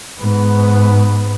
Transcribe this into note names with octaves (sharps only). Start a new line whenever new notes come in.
G#2 B3